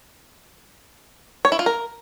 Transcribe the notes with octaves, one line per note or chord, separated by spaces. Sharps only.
C#5
E4
F4
A#4